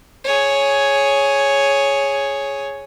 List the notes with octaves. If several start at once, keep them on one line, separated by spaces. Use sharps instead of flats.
G#4 C#5